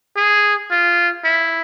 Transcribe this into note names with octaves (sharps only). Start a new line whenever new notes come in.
G#4
F4
E4